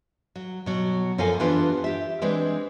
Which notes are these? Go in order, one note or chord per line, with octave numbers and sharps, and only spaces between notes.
F#3
B2 F#3
F#2 F3 A4 A#4 F5 G#5
E3 B3 D4 F4 G4
G4 E5
E3 G#3 C4 D4